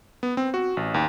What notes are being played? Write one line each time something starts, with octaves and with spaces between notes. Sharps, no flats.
B3
C4
F#4
A1
D#2